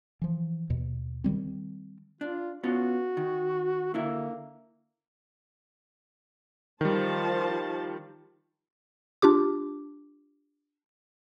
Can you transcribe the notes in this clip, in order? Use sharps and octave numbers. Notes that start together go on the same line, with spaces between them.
E3 F3
D#2 B2
D#3 E3 G3 C4
D4 F4
B3 C#4 F4 F#4
D#3
D3 A#3 E4 E5
D#3 F3 G3 C5 A5
D4 F4 G4 D6